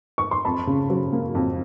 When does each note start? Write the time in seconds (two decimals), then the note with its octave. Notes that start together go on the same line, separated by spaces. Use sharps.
0.18 C#6
0.31 C6
0.45 F2 A5 B5
0.67 C#3
0.90 F#3
1.13 A#3
1.35 F2